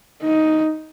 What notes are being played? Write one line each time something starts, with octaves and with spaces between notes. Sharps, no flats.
D#4